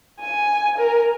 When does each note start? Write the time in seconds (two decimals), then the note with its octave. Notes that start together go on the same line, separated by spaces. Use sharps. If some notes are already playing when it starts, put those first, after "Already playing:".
0.20 G#5
0.78 A#4